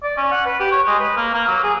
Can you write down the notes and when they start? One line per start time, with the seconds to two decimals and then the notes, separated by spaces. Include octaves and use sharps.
0.03 D5
0.17 C#4
0.32 F#5
0.46 B4
0.60 G4
0.72 C#5
0.87 G#3
0.99 B4
1.17 A#3
1.34 A#3
1.47 F#3
1.63 G#4